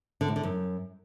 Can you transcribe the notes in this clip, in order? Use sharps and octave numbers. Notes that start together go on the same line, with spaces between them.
D3
A2
D3
F#2